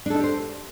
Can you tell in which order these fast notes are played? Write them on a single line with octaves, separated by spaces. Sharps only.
D4 A4 D#4 G4 C5